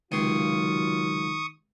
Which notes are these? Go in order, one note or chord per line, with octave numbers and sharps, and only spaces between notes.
C#2 C3 D#3 F#3 F4 C6 C#6 D#6